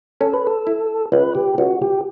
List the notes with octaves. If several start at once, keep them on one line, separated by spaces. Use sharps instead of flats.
C#4 A4
B4
A4
E4
C#2 B4
G4
C#2 F#4
G4